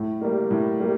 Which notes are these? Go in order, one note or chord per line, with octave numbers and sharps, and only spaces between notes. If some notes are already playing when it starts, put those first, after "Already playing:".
Already playing: A2
G3 A#3
A2
G3 A#3